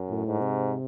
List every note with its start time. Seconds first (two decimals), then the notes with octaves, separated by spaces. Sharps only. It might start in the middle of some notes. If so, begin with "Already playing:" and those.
Already playing: F#2
0.09 A2
0.26 G#2
0.41 C3